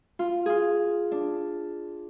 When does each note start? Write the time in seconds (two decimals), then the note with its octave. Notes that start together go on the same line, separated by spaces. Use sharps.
0.19 F4
0.46 F4 G#4
1.12 D4